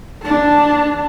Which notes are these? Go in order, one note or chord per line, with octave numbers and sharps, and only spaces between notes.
D4 A5